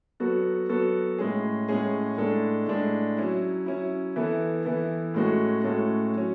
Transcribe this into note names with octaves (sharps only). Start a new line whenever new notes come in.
F#3 B3 F#4 A4
F#3 B3 F#4 A4
A2 G#3 C#4 G#4
A2 G#3 C#4 G#4
A2 G#3 D4 A4
A2 G#3 D4 A4
F#3 C#4 E4
F#3 C#4 E4
E3 B3 E4 A4
E3 B3 E4 A4
A2 G#3 C#4 F#4 A4
A2 G#3 C#4 F#4 A4
F#3 C#4